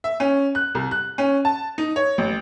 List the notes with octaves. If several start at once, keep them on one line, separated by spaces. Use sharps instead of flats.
E5
C#4
F#6
C2
F#6
C#4
A5
D#4
C#5
A1